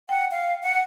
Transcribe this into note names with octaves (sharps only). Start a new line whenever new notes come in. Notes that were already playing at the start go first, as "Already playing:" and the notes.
F#5 G5
F5
F#5